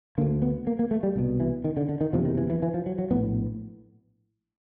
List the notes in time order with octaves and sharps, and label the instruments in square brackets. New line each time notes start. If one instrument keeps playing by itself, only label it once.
[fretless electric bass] D3 A#3
D2
B3
A#3
A#3
A3
G3
C2 B2
E3
D#3
D3
D3
D#3
F#1 E2 C3 F3
D#3
E3
E3
E3
F3
F#3
F#3
A#1 A2 B3